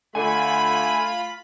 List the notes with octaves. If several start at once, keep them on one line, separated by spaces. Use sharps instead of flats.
D3 A3 F4 G#5 B5